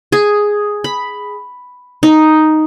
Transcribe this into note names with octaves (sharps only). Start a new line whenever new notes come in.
G#4
B5
D#4